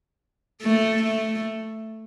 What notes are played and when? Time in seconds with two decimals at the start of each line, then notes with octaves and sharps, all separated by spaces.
0.62 A3
1.03 A3